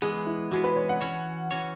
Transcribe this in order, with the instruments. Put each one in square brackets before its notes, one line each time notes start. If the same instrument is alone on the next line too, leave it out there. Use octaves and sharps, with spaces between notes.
[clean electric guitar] E3 G#3 B3 [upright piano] G#4
[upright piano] E4
[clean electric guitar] E3 G#3 B3 [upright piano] F#4
[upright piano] B4
C#5
F#5
[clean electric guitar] E3 C#4 F#4 C#5
E3 C#4 F#4 C#5